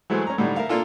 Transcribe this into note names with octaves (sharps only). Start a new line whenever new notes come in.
E3 F#3 G#3 A3 C5
C#4 A#5
A2 D3 G3 D#4
A#4 E5 F5
A#3 D4 F4 A4